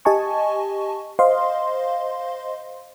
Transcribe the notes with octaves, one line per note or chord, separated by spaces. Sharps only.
G4 D#5 G#5 A5 C#6
C5 D#5 F5 C6